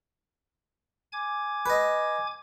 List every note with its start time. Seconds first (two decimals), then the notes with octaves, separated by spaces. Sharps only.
1.13 G#5 D6 G#6
1.66 B4 D#5